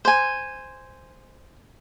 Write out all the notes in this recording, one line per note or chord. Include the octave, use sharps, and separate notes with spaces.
C5 G#5